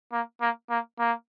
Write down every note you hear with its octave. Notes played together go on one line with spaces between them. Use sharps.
A#3
A#3
A#3
A#3